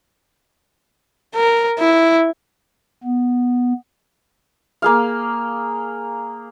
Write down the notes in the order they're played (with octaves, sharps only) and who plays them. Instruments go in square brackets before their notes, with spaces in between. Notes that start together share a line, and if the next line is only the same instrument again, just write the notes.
[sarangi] A#4
E4
[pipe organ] B3
[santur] A#3 G#4 F5